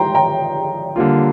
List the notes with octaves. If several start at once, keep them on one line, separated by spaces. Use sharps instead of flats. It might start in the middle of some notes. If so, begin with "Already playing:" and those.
Already playing: G5 A#5 C6
G5 A#5
D3 G3 A#3 F4